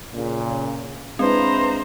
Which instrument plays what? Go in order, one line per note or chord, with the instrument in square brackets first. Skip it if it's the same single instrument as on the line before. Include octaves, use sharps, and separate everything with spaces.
[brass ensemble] A#2 C#3
[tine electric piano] G#3 D4 [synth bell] C4 [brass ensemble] E4 B4 [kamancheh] C5 A#5